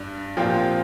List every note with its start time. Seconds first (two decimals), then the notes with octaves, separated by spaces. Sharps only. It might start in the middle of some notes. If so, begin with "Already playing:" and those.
Already playing: G2 G3
0.37 A#2 F3 C4 G4